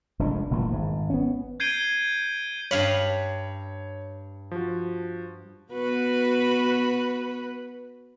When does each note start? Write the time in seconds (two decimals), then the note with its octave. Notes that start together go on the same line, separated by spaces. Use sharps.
0.19 F1 F2 G#3 D4
0.51 F#1 A#2 E3 A3
0.71 G#1 G#2
1.10 B3 C#4
1.60 G6 G#6 C7 D7 D#7 G7
2.71 G2 C#5 F5 B5
4.51 F3 F#4
5.73 B3 F#4 B4